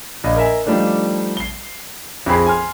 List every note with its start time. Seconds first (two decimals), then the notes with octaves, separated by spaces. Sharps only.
0.24 A#1 D#5 F5
0.36 A#4 D#5 E5 G#5
0.66 F3 G3 A3 D4 D#4
1.37 C7 G7
2.26 F2 C4 G#4 B5 C7
2.47 G#5 C6 F6